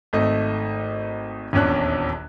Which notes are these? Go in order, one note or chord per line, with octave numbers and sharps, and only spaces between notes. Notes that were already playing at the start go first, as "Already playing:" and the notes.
G#1 A3 D#4 D#5
D#1 A#1 E2 C#4 D4 F#6